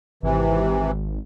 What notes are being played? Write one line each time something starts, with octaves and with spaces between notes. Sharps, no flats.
G#1 C3 E3